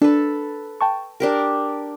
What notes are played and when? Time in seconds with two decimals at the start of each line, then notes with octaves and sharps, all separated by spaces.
0.02 D4 A4 B4
0.81 G5 A5 C#6
1.20 D4 G4 A#4